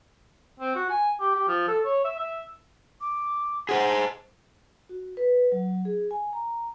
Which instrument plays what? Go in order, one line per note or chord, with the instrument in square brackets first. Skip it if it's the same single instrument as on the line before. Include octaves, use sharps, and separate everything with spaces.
[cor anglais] C4
F#4
G#5
G4
G4
F3
A4
C#5
E5
E5
[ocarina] D6
[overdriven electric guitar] G#4 C5 [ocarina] F#5
[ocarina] A5
[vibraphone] F#4
B4
F#3
G#4
G#5
A#5